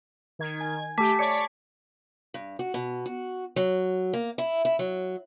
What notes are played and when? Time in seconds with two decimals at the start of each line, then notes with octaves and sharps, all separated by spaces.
0.39 D#3 G#6
0.61 G#5
0.98 A3 G4 A5 D6 B6
1.19 C#5 D5 C#6 C#7
2.34 G2
2.59 F#4
2.74 B2
3.06 F#4
3.56 F#3
4.13 A#3
4.38 E4
4.65 E4
4.79 F#3